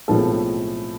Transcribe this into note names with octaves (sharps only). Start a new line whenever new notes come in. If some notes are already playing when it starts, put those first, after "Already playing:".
B1 A2 F3 G#3 C4 A4